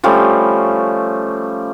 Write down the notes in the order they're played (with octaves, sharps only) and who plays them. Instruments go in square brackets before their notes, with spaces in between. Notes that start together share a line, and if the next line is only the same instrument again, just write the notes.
[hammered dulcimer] F3 G3 A3 C#4